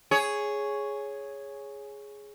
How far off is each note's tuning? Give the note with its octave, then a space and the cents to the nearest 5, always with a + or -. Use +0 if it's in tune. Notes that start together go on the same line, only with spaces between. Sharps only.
G#4 +0 C#5 +0